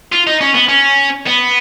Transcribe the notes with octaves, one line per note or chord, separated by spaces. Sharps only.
F4
D#4
C#4
B3
C#4
B3